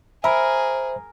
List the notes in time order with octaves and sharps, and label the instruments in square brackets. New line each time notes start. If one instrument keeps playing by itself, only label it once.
[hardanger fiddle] G#4 [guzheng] A#4 [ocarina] C5 [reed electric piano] E5 B5